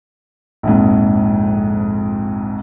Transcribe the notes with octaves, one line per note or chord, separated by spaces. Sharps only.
A#1 F2 G#2